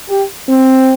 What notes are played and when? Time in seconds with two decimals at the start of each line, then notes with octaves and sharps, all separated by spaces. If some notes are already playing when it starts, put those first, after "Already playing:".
0.09 G4
0.48 C4